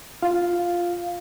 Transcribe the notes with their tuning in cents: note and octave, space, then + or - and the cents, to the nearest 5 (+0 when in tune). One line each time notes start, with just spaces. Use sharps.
F4 +0 F5 +0